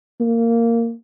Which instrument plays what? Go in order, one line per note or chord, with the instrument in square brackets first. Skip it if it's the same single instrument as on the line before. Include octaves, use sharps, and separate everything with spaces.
[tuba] A#3